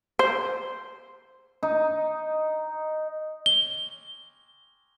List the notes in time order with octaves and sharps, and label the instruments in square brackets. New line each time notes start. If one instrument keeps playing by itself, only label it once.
[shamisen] C5
[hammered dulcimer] D#4
[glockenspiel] G7